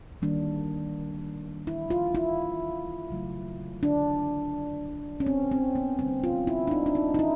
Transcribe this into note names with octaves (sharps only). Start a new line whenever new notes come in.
D#3 G3 A#3 D4
E4
F4
E4
C#3 F#3 A3
D4
C#4
C4
C4
B3
D3 G3 A#3 C4
F4
E4
D4
D#4
D4
D#4
D#4
E4